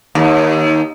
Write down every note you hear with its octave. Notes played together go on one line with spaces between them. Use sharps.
D#2